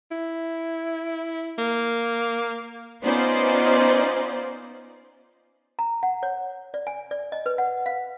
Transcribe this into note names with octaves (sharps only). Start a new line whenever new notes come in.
E4
A#3
B3 C#4 D#4 F4 C5 D5
A#5
F#5
C#5
D5
G#5
D5
D#5
B4
F#5
F5